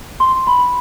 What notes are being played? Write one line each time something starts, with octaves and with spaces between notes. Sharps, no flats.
C6
B5